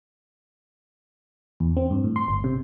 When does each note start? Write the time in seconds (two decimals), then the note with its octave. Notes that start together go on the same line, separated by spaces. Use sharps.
1.60 E2
1.77 C4
1.91 G2
2.04 A2
2.16 C6
2.28 G1
2.44 C3